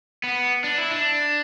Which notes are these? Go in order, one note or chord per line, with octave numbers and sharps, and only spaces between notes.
B3
D4
E4
D4